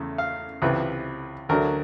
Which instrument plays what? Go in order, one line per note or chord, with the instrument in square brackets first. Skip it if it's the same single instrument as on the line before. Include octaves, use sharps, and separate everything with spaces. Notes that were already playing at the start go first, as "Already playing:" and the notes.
Already playing: [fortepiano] E2 C#3 A3
F5
C#2 C3 E3 B4
D2 D3 F#3 A#4